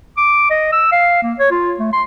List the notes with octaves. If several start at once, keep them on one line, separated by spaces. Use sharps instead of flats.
D6
D#5
E6
F5
A#3
C#5
F4
A3
C6